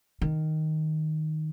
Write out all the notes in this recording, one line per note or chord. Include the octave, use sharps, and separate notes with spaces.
D#3